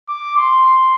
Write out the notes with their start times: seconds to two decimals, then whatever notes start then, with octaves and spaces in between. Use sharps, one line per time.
0.08 D6
0.37 C6